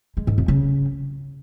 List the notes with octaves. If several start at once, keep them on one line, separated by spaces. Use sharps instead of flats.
G#3
G#2
F2
C#3